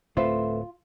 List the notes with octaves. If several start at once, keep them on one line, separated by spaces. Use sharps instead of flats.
D1 A2 A3 C4 F4 B4 C5 E5